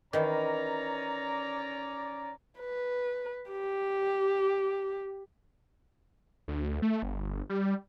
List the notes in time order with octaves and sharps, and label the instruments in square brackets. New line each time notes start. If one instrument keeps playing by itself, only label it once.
[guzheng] D#3 E3 [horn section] C#4 D5 A#5
[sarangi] B4
G4
[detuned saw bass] D2
A3
G1
G3